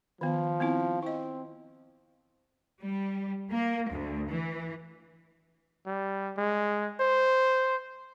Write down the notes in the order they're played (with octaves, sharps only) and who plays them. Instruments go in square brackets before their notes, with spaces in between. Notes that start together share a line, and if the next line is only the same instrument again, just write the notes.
[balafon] D#3 B3 [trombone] F3
[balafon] B3 C4 E4
[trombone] C4 [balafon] E4 D#5
[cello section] G3
A#3
D2
E3
[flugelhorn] G3
G#3
C5